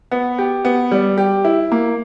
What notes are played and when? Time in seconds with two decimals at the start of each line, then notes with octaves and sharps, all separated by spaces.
0.12 B3
0.38 G4
0.65 B3
0.91 G3
1.18 G4
1.45 E4
1.72 A#3